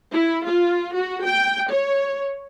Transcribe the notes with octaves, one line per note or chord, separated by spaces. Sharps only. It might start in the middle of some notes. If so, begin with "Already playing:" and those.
E4
F4
F#4
G5
C#5